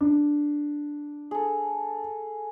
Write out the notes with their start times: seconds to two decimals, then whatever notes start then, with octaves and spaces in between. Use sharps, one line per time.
0.01 D4
1.31 G#4 A4